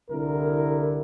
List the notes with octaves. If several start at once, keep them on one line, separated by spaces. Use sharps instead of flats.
C2 D3 E4 A#4